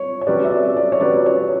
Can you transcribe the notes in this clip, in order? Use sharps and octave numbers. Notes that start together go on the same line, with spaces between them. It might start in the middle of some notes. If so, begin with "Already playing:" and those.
Already playing: C#5
C#5
F#3 C#4 G4 B4 D5
E5
D5
D5
C#5
F#3 C#4 G4 B4 D5
C#5